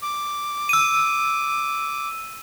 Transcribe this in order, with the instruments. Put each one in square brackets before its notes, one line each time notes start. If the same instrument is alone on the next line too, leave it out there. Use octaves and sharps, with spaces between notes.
[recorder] D6
[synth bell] E6 D#7